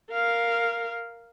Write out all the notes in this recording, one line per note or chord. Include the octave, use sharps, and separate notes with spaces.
A#4 F5